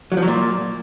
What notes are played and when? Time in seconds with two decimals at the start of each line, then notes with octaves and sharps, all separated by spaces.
0.12 F#3
0.17 F3
0.22 F#3
0.28 A#2